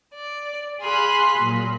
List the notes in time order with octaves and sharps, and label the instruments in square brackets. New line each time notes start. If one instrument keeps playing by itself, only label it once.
[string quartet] D5
G#4 F5 G#5 B5 C6 F#6
A#2 F#3